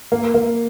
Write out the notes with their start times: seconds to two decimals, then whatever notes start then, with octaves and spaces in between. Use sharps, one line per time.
0.12 A#3
0.34 A#3